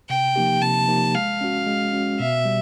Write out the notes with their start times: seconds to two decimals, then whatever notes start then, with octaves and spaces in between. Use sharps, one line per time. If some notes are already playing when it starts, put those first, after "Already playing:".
0.10 C3 G5
0.36 F3 A#3 D#4 G4
0.61 C3 A5
0.88 F3 A#3 D#4 G4
1.15 G#3 F5
1.41 C#4 F#4
1.67 G#3
1.93 C#4 F#4
2.19 B2 E5
2.45 G3